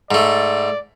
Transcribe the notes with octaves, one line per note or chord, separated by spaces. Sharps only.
G#2 A3 D5